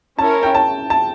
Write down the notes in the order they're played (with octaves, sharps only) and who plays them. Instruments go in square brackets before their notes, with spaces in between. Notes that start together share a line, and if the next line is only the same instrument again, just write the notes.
[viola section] C#4 E4 A#4 C#5 [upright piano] A5
[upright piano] G5
A5
A5